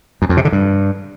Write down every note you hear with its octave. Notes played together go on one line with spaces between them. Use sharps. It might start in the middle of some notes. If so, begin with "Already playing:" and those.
F#2
F2
C3
D3
G2